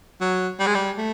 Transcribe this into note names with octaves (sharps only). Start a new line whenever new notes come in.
F#3
G3
G#3
G3
A3